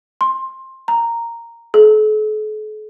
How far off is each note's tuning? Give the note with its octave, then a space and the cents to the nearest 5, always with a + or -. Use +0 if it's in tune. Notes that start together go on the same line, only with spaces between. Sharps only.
C6 +15
A#5 -5
A4 -45